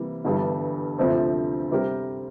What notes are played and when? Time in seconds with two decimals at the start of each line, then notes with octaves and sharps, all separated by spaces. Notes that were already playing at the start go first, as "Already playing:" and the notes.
Already playing: C3 E3 G3 A#3
0.25 G1 G2 E3 G3
0.99 D2 C3 F3 C4
1.71 C3 G3 C4 G4 A#4